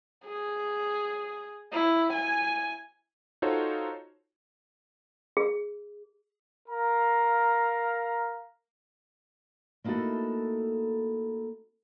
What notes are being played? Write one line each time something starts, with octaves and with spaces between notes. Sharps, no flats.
G#4
E4
G#5
D#4 F4 F#4 A4 C5 C#5
G#4
A#4 F5 A#5
A3 A#3 D#4 E4 F#4 A4